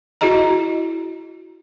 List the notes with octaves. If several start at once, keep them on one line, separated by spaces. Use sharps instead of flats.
E4 F#4 G#4 D#5 A#5